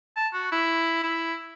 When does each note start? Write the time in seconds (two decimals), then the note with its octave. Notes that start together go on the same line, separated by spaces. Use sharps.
0.16 A5
0.33 F#4
0.52 E4
1.03 E4